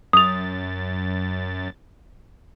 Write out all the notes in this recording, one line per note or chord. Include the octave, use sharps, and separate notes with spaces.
F#2 D#6 A6 F7